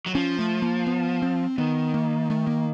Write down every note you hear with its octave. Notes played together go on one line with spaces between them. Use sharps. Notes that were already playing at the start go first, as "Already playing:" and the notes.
F#3
F3 C#4
A3
A#3
B3
C4
D#3 B3
A#3
A3
A#3